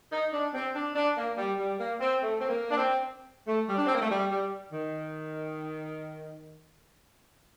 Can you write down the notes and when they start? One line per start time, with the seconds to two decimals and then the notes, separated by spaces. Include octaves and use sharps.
0.12 D#4
0.33 D4
0.54 C4
0.74 D4
0.95 D4
1.17 A#3
1.37 G3
1.58 G3
1.79 A#3
2.00 C4
2.21 A3
2.40 C4
2.48 A#3
2.70 D4
2.77 C4
3.47 A3
3.67 G3
3.77 D4
3.86 C4
3.94 A#3
4.01 A3
4.10 G3
4.30 G3
4.72 D#3